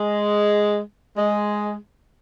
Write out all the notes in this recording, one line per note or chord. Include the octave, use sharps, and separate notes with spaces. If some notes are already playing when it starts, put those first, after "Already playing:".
Already playing: G#3
G#3